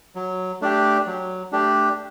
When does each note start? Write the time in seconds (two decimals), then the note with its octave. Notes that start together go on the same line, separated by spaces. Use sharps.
0.15 F#3
0.61 A3 D4 G4
1.06 F#3
1.52 A3 D4 G4